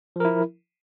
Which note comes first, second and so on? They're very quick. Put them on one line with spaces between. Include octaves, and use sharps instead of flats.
F3 A#4 E4